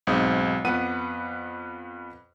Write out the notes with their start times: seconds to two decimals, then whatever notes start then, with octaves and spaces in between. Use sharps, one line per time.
0.07 B1 G#2 C4 D#6
0.65 F2 B3 B4 F#5 D#7